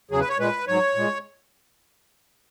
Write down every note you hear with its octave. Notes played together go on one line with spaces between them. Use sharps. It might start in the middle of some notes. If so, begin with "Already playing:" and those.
E2 C#3 F#3 G#4
B4
C#5
A#2 G#3 B4
G#2 F#3 C#5
A#2 G#3